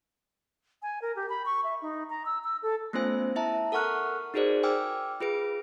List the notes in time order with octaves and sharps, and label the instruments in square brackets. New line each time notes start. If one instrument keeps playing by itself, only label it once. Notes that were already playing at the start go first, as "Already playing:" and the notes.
[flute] G#5
A#4
G4
B5
C#6
E5
D#4
A#5
E6
E6
A4
[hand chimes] A3 B3 C#4 F4 C5 G#5
E4 E5 A5 A#5
A4 A#4 F#5 C#6 F6 F#6
D#4 F#4 G#4 A#4 C5 D5
G5 G#5 D6 E6 F6
F4 G#4 B4 D7